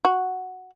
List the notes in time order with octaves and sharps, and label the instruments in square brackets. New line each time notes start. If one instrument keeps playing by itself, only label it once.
[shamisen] F#4